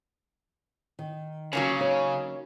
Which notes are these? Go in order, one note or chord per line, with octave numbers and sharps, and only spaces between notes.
D#3
C#3 F#3 A#3 C#4
D#4 C#5